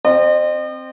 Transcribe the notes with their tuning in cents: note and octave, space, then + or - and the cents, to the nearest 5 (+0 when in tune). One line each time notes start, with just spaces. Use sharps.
C4 +0 D#5 -40